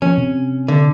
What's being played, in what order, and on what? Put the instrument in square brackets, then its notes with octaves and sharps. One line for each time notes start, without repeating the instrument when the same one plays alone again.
[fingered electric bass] F3 [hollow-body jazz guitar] C#4
[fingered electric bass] C3
[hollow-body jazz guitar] D3